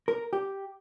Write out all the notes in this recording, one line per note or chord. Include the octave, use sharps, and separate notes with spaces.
A#4
G4